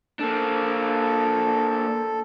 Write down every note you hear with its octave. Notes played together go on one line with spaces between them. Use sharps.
A#3 D4 A4